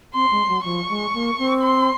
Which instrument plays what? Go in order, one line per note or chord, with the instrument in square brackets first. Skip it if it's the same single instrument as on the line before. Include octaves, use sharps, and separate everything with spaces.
[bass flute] C4 [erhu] C6
[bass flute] G#3
F#3
[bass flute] F3 [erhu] C#6
[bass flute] G#3
A#3
C4
[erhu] C6